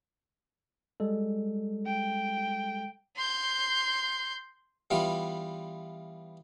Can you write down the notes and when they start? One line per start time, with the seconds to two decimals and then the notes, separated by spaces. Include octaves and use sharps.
1.00 G3 G#3 A4
1.86 G5
3.16 C6 G6
4.90 E3 G3 B3 F4 D5